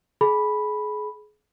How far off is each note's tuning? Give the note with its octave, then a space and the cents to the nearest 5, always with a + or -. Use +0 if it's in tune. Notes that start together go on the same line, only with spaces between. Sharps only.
G#4 +30 B5 -5